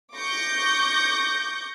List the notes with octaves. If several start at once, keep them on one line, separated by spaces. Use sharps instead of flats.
C#6 D6 G6 A#6